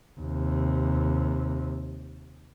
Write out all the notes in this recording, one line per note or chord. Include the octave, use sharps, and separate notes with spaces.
D#2 C3